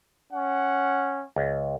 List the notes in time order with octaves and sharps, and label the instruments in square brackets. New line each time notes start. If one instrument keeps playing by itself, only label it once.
[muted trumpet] C#4 [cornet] F#5
[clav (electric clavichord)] C#2